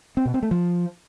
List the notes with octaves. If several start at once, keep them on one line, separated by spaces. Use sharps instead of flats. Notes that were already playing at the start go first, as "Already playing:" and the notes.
C4
B2
C4
A3
F3